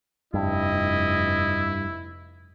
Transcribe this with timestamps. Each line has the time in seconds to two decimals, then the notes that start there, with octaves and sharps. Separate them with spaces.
0.34 F1 G2 E4 D#5